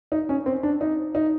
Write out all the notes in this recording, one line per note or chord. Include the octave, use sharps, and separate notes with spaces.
D#4
C#4
C4
D4
D#4
D#4